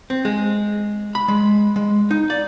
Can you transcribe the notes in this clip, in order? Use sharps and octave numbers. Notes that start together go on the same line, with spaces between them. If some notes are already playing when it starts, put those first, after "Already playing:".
C4
G#3
B5
G#3
G#3
D#4
D5